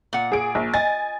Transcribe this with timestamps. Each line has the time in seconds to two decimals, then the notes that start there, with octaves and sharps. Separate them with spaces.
0.13 A#2 F#5
0.32 G#4 D7
0.55 A#1
0.74 D#5 G#5 A6